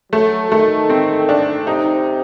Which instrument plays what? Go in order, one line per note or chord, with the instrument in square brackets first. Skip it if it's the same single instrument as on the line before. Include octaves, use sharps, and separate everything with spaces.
[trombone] F#3 [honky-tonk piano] A3
[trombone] D#3 [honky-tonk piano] A3
[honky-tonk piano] C4
D4
[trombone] C3 [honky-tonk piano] D#4